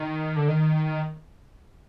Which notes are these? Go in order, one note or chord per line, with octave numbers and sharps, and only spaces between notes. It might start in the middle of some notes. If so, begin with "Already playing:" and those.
Already playing: D#3
D3
D#3